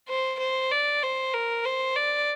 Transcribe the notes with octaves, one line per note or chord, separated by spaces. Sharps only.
C5
C5
D5
C5
A#4
C5
D5